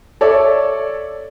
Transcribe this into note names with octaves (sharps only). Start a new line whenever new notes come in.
A4 C#5 D5 E5